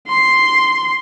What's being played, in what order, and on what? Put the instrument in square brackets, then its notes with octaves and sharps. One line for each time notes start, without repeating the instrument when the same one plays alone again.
[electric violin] C6